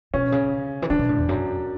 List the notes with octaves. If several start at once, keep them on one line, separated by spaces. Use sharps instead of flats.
B2 C#4
C#3
E3
D3 D4
B2
A2
E2
F#2